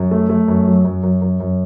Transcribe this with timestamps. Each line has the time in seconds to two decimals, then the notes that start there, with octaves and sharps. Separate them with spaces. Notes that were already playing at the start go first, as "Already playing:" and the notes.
Already playing: F#2
0.11 A3
0.30 A3
0.48 F#2
0.67 F#3
0.85 F#2
1.03 F#2
1.22 F#2
1.40 F#2